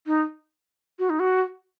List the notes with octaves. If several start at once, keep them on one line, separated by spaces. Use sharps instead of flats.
D#4
F#4
D#4
F#4